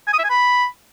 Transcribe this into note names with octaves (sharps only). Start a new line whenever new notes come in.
G#5
D#6
E5
G#5
B5